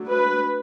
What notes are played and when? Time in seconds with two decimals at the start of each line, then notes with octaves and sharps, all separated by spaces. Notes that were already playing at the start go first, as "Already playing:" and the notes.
Already playing: F#3 A3 D4
0.08 B4